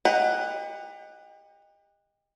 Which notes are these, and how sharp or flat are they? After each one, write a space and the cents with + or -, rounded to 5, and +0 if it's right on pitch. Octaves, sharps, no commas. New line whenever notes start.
G4 +35 D#5 +0 F#5 +0